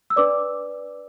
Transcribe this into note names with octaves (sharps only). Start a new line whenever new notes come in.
E6
D4 B4 D5 D6